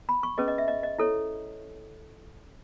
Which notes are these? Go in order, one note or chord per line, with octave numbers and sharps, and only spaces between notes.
B5
C#6
C#4 G#4 B4 D#5
D#5
E5
D#5
D#5
E4 A4 C#5